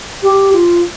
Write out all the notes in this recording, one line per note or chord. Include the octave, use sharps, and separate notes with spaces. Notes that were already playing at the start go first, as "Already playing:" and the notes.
G4
F4